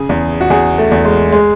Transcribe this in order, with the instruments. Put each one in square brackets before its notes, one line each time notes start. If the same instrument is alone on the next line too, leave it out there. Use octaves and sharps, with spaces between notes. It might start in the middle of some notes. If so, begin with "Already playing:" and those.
Already playing: [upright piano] C#3 G#4
E2
F#4
E2 G#4
A3
E2
G#3
G#3